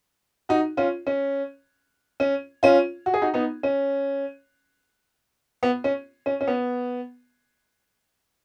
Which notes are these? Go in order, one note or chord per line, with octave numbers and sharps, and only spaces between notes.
D#4 F#4
C#4 F4
C#4
C#4
C#4 F4
F#4
G#4
D#4 F#4
B3 D#4
C#4
B3
C#4
C#4
C#4
B3